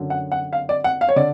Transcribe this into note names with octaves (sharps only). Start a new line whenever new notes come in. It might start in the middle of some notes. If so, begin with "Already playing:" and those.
Already playing: F#2 D3 F#3
F#5
F#5
F5
D5
F#5
F5
C#5
D3 D5